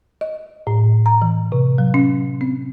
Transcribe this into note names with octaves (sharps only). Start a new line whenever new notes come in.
D#5
A2
A#5
E3
C3
F#3
C#4
C4